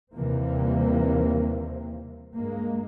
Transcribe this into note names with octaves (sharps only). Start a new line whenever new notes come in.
D#2 C3 E3 G3 A#3 C4
G2 G#3 A#3